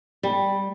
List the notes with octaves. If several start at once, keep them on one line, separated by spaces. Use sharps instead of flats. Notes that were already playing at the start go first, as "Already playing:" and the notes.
G3